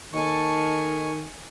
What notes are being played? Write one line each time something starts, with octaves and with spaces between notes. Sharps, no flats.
D#2 D#3 A4 G#5 C#6